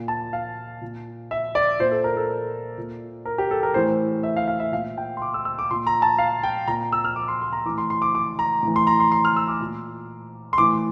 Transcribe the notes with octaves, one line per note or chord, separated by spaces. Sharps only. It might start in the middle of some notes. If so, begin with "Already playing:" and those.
Already playing: A#2
A5
F5
A#2
E5
D5
A#2 C5
A4
A#4
A4
A#2
A#4
G4
A4
A#4
A2 E3 C5
E5
F5
F5
E5
A#2 F5
G5
C6
D6
E6
E6
D6
A#2 C6
A#5
A5
F5
G5
A#2 A#5
E6
F6
D6
C6
C6
A#5
A2 E3 D6
C6
C6
D6
D6
A#5
A2 E3
C6
A#5
C6
C6
F6
E6
D6
A#2
C6
A2 E3 D6